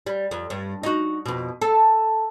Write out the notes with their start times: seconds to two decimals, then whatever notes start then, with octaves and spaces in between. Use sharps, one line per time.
0.06 G3
0.31 F2
0.50 G2
0.83 D#4 F#4
1.26 F2 B2
1.61 A4